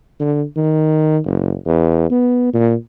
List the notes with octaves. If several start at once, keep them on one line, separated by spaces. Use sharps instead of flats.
D3
D#3
F#1
E2
B3
A#2